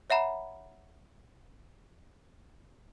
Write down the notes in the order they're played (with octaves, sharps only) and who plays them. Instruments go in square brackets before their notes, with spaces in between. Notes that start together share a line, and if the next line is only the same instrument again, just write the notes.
[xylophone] C#5 E5 F#5 A#5 B5